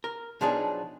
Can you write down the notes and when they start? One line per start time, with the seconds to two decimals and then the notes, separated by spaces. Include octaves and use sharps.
0.04 A#4
0.41 B2 F3 F#3 D4 D#4 G#4